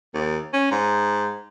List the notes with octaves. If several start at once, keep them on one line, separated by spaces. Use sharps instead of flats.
D#2
C#4
G#2